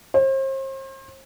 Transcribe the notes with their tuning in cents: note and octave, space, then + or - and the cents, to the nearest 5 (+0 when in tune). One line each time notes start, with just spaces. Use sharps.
C5 +40